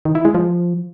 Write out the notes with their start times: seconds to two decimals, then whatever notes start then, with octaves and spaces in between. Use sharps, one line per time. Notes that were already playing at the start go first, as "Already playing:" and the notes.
0.05 D#3
0.15 E4
0.25 G#3
0.35 F3